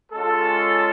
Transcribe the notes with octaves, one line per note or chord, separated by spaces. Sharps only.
G#3 C#4 F4 A4